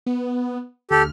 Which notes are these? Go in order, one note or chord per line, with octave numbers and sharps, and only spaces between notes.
B3
D2 G4 A4 F6